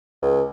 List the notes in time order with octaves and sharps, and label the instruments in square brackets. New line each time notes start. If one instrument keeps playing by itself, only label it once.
[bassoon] C#2